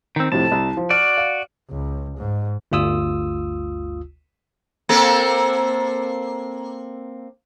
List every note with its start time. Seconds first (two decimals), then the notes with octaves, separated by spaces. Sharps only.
0.16 D#3 C4
0.32 F2 A2 C3 A5
0.51 C2
0.77 F3
0.90 F#4 D5 F6
1.18 F5
1.70 C#2
2.18 G#2
2.71 G1 D2 F4 D#6 E6
4.89 A#3 C4 A4